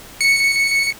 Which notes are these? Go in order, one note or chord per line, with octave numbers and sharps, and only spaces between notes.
C#7